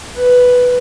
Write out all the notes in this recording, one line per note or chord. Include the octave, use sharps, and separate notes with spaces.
B4